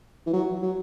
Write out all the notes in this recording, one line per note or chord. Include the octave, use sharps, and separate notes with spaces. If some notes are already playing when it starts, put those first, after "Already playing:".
E3
F#3
F#3